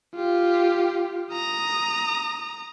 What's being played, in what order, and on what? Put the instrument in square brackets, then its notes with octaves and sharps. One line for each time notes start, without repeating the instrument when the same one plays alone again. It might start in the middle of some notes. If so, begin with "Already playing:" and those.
[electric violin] F4 G4
A#5 D#6